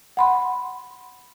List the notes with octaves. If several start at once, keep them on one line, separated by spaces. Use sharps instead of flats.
F#5 B5 C6